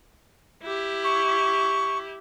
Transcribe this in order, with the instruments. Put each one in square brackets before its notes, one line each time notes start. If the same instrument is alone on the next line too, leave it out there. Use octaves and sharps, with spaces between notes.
[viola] E4 G4
[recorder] C#6